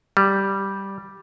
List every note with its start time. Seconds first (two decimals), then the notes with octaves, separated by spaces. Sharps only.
0.17 G3